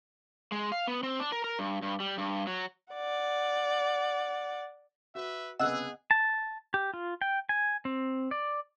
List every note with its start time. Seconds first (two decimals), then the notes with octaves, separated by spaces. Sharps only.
0.52 G#3
0.72 F5
0.87 B3
1.03 C4
1.19 D4
1.32 A#4
1.44 A#4
1.59 G2
1.82 G2
2.00 G3
2.18 G2
2.47 F#3
2.94 D5 F#5
5.15 F#4 B4 E5
5.60 C2 C#3 B3 G#4 D#5 F#5 E6 F#6
6.11 A5
6.74 G4
6.94 F4
7.22 G5
7.49 G#5
7.85 C4
8.31 D5